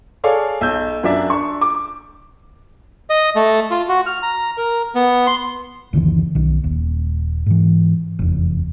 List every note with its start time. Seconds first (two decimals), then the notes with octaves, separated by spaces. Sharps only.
0.24 G#4 A4 C#5 D5 F5
0.61 B1 E6 G6
1.03 F#2 F#3 D4 D5 E5
1.30 D4 C#6
1.61 D6
3.10 D#5
3.36 A3
3.71 F4
3.89 F#4
4.06 F6
4.23 A#5
4.57 A#4
4.95 B3
5.27 C6
5.93 F#1 D2 D#3 E3
6.35 B1 D#3
6.64 D#1
7.46 G#2 E3
8.19 F1 E2